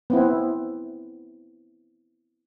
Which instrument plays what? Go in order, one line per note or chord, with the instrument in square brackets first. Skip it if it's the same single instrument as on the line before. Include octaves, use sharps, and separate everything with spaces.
[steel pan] B3 C4 E4